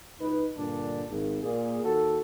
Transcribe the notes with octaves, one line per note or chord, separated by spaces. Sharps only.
C#2 D#4 B4
G2 A#2 D3 D4
G#1
A#2 A#3 G#4
D#2 F#4 A4